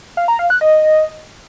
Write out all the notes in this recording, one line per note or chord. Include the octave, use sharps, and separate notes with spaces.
F5
A#5
F5
F#6
D#5